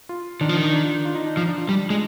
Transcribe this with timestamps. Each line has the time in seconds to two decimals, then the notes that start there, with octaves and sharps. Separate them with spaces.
0.09 F4
0.41 D#3 D4
0.49 F3
0.57 D#3
0.73 D4
0.84 F4
1.05 F4
1.15 D#4
1.26 D4
1.37 F3
1.48 D4
1.58 F4
1.68 G3 D4
1.90 G#3